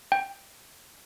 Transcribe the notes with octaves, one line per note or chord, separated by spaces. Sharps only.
G5